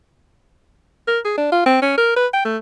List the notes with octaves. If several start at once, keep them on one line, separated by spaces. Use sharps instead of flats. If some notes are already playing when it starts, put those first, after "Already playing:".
A#4
G#4
D4
F4
C4
C#4
A#4
B4
G5
A3